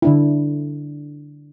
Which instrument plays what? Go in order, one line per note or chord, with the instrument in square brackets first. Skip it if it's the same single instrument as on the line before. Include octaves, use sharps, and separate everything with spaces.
[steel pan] D3 D4 E4